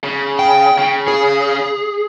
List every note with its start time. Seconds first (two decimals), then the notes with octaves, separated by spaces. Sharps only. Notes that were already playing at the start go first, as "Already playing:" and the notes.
0.04 C#3
0.39 G5
0.78 C#3
1.08 G#4